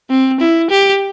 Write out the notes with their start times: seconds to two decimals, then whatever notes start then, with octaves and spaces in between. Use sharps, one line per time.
0.10 C4
0.40 E4
0.70 G4